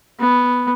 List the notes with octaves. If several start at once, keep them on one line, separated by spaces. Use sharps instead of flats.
B3